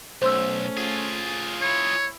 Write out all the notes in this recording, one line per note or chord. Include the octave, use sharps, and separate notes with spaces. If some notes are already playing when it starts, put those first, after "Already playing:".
B1 A3 C#4 C5 C6 E6
F4 G#4
E4 C#5